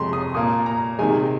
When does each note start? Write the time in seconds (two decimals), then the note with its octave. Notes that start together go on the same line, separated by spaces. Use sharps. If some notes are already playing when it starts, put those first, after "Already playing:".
Already playing: F2 C3 G#3 C6
0.13 D#6
0.34 A#2 A#3 D#6
0.66 A#5
0.99 C3 D#3 G#3 G#5